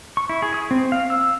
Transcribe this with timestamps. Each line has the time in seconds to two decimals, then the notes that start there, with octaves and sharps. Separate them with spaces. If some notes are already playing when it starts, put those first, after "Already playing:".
0.17 C#6
0.29 E4
0.42 G#4
0.54 D#6
0.71 C4
0.92 F5
1.10 E6